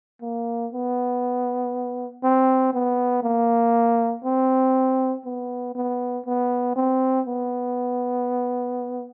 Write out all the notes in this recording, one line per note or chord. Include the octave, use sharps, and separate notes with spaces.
A#3
B3
C4
B3
A#3
C4
B3
B3
B3
C4
B3